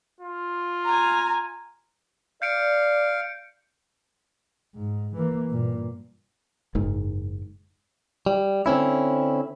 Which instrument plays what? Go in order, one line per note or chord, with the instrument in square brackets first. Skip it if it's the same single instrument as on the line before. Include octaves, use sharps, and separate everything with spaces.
[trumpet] F4
[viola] G#5 A#5
[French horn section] D5 [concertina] F5 [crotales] G6 C#7 D7
[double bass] G#2
E3 A#3
G2 A#2
[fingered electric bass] F#1 G#2
[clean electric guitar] G3
D3 C4 C#4 E4